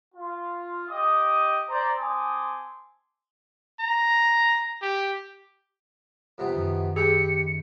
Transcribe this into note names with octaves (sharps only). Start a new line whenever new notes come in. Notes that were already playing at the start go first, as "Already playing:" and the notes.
F4
G4 D#5 D6 D#6
C5 D5 A#5
C4 G#5 A5 C6 D6 D#6
A#5
G4
F2 C3 B3
F#2 D#3
G4 G#4 B4 C#7